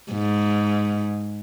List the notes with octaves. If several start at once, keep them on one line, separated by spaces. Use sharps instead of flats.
G#2